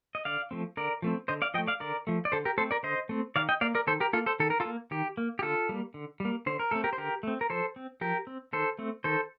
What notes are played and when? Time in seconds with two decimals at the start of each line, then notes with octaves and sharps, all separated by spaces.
0.15 D#5
0.25 D3 D5 F5
0.51 F3 A3 C4
0.77 D3 A#4 D5
1.02 F3 A3 C4
1.28 D3 C5 D#5
1.42 D5 F5
1.54 F3 D#5 G5
1.58 A3
1.67 D5 F5
1.80 D3 A#4 D5
2.07 F3 A3
2.25 D5
2.32 D3 A4 C5
2.45 G4 A#4
2.58 A3 C4 A4 C5
2.71 A#4 D5
2.83 D3 C5 D#5
3.09 A3 C4
3.36 D#3 D5 F5
3.49 D#5 G5
3.61 A#3 D5 F5
3.75 A#4 D5
3.87 D#3 A4 C5
4.00 G4 A#4
4.13 A#3 F4 A4
4.26 A4 C5
4.40 D#3 A4
4.50 A#4
4.60 F4 A4
4.65 A#3
4.91 D#3 G4
5.17 A#3
5.39 G4
5.42 D3 F4 A4
5.69 G3 A#3
5.94 D3
6.20 G3 A#3
6.46 D3 C5
6.59 A#4
6.71 A3 C4 A4
6.84 G4 A#4
6.93 C5
6.98 D3 G4 A#4
7.23 A3 C4
7.41 A#4
7.50 F3 A4 C5
7.76 C4
8.01 F3 G4 A#4
8.27 C4
8.53 D#3 A4 C5
8.79 A3 C4
9.04 D#3 A4 C5